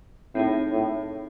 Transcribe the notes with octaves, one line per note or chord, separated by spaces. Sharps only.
A2 C4 D#4 G#4
A2